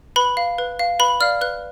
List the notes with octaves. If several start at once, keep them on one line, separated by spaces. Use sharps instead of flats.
B4 B5
F5
B4
F5
B4 B5
D5 F5 F6
B4 F#6